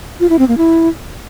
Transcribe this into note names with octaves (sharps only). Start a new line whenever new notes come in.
F4
E4
C4
A#3
E4